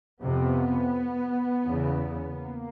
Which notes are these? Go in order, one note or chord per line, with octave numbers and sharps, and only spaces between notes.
F2 C3 B3
E2 C#3
A#3